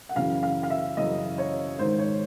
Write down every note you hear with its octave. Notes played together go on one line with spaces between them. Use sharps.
F#5
F#2 C#3 E3 F5
F5
F5
E5
F#2 C#3 E3 D#5
C#5
G#2 D#3 C5
C#5